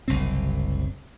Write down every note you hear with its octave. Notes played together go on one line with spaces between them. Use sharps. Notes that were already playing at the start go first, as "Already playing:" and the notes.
F#1 C2 C3 C4